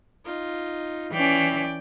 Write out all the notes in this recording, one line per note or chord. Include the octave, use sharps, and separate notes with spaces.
D#4 F4
E3 C#4 D5 G5